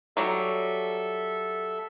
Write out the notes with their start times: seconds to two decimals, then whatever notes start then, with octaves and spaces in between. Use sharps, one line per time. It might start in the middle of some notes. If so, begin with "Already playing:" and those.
0.17 F#3 G3 A4 E5